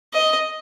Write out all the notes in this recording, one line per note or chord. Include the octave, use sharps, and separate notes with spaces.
D#5